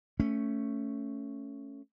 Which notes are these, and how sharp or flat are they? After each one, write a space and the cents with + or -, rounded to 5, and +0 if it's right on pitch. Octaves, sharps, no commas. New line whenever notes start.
A3 +10 C#4 +0